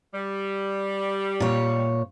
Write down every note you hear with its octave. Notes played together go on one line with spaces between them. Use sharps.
G3
A#2 C#5